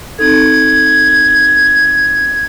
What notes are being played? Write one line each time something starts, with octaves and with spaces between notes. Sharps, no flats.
C4 D#4 A4 G#6